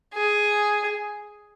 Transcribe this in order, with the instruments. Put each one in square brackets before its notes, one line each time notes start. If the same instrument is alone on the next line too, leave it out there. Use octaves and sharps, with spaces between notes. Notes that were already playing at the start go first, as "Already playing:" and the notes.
[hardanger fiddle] G#4